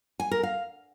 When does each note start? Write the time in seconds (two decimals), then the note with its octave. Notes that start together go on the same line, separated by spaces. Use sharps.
0.20 G#5
0.31 A#4
0.43 F5